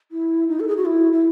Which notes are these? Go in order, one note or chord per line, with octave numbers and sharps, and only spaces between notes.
E4
D#4
A4
G#4
F#4
E4
E4